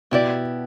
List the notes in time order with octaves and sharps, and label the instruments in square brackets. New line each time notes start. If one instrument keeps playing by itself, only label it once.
[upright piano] B2 [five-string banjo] B3 E4 G4 D5